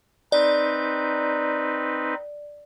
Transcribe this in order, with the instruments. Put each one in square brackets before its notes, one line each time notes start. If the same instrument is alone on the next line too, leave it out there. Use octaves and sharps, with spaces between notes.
[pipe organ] C4 D#4 B4 [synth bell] D5